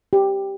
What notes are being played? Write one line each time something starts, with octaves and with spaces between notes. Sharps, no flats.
G4